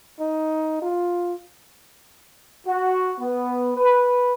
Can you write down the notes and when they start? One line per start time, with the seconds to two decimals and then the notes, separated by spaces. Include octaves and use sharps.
0.20 D#4
0.82 F4
2.67 F#4
3.20 B3
3.77 B4